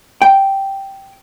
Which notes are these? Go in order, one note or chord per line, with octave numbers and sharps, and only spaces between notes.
G5